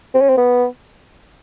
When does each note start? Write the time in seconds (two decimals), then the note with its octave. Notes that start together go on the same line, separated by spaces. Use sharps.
0.14 C4
0.21 C#4
0.29 C4
0.38 B3